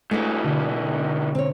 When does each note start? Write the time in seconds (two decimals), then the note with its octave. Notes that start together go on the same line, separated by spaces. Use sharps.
0.11 G#2 E3 A3 D4 F#4
0.43 B2 D3
1.35 C4 C#5